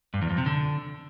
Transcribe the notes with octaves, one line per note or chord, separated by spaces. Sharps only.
G2
E2
F2
C3
D3